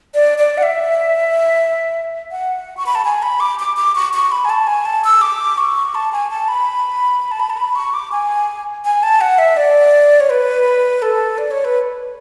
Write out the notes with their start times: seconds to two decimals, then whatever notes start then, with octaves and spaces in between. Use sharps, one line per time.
0.14 D5
0.38 D5
0.58 F#5
0.63 E5
2.31 F#5
2.77 C#6
2.86 B5
2.95 A5
3.05 G#5
3.22 B5
3.40 D6
3.59 D6
3.77 D6
3.95 C#6
4.14 C#6
4.32 B5
4.45 G#5
4.50 A5
4.67 G#5
4.85 A5
5.04 E6
5.21 D6
5.58 C#6
5.95 A5
6.12 G#5
6.31 A5
6.48 B5
7.31 A5
7.40 B5
7.50 A5
7.57 B5
7.75 C#6
7.94 D6
8.12 G#5
8.85 G#5
9.03 A5
9.21 F#5
9.38 E5
9.57 D5
10.20 C#5
10.30 B4
11.02 A4
11.38 D5
11.51 C#5
11.65 B4